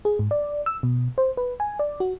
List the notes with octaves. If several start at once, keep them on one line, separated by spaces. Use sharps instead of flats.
G#4
G#2
D5
E6
B2
C5
B4
G#5
D5
F#4